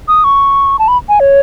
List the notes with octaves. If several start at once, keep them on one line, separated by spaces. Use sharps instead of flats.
D#6
C#6
A5
B5
G#5
C#5